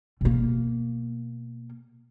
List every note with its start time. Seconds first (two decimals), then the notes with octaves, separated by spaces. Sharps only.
0.21 B2 A#3